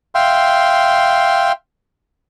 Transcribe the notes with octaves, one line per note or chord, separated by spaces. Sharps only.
E5 F5 G5 C6